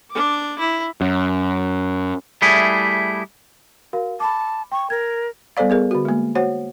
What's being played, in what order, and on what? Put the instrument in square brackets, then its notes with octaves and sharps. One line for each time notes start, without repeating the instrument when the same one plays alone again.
[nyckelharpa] D4 D6
E4
[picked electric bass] F#2
[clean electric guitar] G3 A3 E4 G#4
[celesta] F#4 A#4 F5
[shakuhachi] A5 [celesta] B5 D6
[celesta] G5 [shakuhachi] C#6
[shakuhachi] A#4 [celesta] G#6
[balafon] G3 B3 A4 C5 D5 F5
B3 G#4 A#4
D3 F#4
G#3 A#3
F#4 C5 C#5 F#5